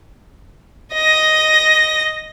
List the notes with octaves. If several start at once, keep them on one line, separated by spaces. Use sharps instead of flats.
D#5 A#6